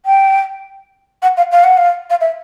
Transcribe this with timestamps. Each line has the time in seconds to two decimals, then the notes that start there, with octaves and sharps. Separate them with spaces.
0.06 G5
1.22 F#5
1.37 F5
1.51 F5
1.64 F#5
1.77 F5
2.10 F5
2.20 E5